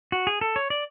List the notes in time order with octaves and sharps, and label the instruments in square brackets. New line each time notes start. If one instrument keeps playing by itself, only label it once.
[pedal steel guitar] F#4
G#4
A4
C#5
D5